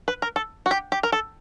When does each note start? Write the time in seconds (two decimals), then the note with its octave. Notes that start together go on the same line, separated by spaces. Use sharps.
0.08 B4
0.22 A#4
0.36 A4
0.66 F#4
0.71 G4
0.92 G4
1.03 A#4
1.12 A4